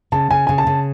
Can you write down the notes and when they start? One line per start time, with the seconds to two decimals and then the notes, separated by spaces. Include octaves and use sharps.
0.12 C#3 A5
0.31 C#3 G#5
0.47 C#3 G#5
0.58 A5
0.67 C#3